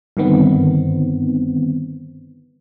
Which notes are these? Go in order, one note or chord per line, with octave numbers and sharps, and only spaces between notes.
G2 D3 D#3 B3 C4